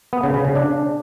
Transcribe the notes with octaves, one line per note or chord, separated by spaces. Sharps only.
B3
C#3
C#3
C#3
D4